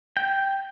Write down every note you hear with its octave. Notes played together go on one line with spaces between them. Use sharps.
G5